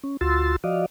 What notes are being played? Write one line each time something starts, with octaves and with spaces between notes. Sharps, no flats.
C#4
D2 F4 F#4 C6 E6 A6
F3 F#4 D5 D#5 F5